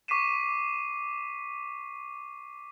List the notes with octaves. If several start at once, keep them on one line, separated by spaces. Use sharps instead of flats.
C#6 D6 B6 C7 D#7 E7